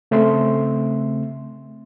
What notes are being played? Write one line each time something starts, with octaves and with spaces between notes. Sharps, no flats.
C#3 A3 C4 E5 C6